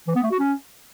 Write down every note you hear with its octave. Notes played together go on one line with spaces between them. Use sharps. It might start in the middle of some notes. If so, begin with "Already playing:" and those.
E3
B3
A3
F#4
C#4